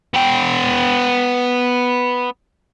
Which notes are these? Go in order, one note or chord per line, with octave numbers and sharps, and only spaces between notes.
B3 G5